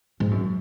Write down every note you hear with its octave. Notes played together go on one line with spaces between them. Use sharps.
G#2
F#2